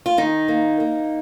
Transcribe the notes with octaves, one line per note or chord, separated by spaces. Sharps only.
F4
D#3 D#4
A#3
A#3